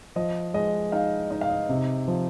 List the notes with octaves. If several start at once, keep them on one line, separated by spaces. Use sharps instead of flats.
F3 D#5
G#3 D#5
D#4 F5
D#4 D#5
F5
D#5
C3
F3